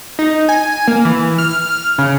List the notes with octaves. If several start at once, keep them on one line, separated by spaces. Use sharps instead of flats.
D#4
G#5
A#3
E3
F6
C#3